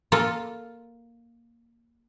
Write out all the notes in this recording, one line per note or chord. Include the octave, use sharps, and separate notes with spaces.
A#3 F4 A4